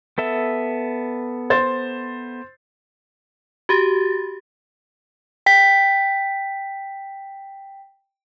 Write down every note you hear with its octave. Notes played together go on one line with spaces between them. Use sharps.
B3 A4 E5
C5 A6
F#4 G4 A6
G5 B6